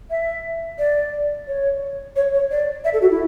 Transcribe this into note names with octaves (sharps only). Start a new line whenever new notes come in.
E5
D5
C#5
C#5
C#5
D5
E5
A4
F#4
E4